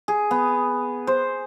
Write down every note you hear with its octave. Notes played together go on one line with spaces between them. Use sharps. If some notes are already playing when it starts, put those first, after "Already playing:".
G#4
B3
C5